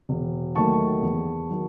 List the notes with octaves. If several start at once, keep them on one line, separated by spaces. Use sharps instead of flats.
E1
D#2 D#3 F#3 A3 A5 C#6
E2
D#3 F#3